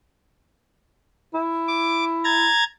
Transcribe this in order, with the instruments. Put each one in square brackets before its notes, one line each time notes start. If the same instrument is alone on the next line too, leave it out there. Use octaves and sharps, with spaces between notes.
[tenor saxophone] E4
[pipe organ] D6
A#5 G#6 A6